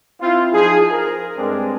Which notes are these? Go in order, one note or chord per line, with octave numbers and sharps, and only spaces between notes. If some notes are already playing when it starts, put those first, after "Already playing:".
C4 E4 F4
F3 D#4 G#4
A#4
G2 G#3 C4 D4